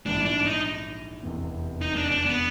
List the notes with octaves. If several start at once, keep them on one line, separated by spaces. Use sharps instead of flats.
A#1 G#2 E3 G3 D4
D4
D#4
F1 E2 C3
D#4
D4
D4
B3